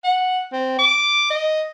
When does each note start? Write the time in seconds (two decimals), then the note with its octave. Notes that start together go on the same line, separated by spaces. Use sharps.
0.04 F#5
0.52 C4
0.79 D6
1.30 D#5